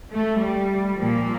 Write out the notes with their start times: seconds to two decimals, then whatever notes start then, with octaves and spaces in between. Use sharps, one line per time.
0.12 A3
0.41 G3
0.98 A#2 F3 A#3